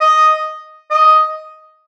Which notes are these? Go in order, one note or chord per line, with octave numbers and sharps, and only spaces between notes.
D#5
D#5